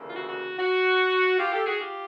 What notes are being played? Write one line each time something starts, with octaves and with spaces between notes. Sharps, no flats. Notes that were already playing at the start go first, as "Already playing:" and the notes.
Already playing: D2 C#3 E3 G3 A#3
F4
F#4
F#4
F#4
F4 G4
G4 A4
F#4 G#4
F4 G4